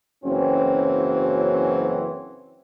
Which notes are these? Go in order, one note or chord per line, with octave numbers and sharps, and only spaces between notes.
F#1 E3 F#3 C4 C#4